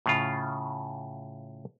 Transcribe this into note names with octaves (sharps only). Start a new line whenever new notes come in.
A2 C#3 F4